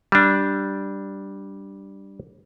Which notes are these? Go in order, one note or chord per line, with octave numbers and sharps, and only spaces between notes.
G3 D4